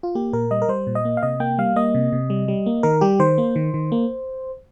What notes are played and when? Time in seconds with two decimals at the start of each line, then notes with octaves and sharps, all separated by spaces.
0.03 F4
0.15 A#3 G4
0.33 A#2 A#4
0.51 G3 D#5
0.62 A#4
0.68 G3 C5
0.87 A#2
0.95 D#5
1.05 A#3
1.17 F5
1.23 C3 D#5
1.40 A#3 G5
1.58 G3 F5
1.76 A#3 D#5
1.94 C3
2.12 C3
2.30 G3
2.48 G3
2.66 A#3
2.83 D#3 A#4
3.01 G3 G4
3.19 D#3 C5
3.38 A#3
3.56 D#3
3.74 D#3
3.92 A#3